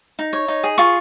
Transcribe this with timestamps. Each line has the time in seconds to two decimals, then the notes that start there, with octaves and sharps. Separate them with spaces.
0.19 D#4
0.33 C#5
0.48 D#4
0.63 G#4
0.78 F4 C#6